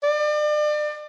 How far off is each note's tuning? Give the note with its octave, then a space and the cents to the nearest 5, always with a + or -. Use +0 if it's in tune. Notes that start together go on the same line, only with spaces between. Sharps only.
D5 +35